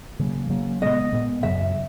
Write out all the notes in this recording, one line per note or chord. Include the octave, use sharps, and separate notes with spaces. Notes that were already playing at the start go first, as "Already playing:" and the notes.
C#3 F#3 A#3
C#3 F#3 A#3
A#2 G#3 B3 D#5
A#2 G#3 B3
F#2 C#3 F#3 E5